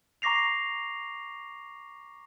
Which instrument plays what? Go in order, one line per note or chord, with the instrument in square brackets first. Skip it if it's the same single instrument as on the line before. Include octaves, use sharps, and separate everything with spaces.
[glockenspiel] A#5 C#6 D6 A#6 C7 F7